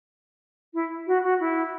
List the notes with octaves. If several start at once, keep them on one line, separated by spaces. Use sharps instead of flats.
E4
F#4
F#4
E4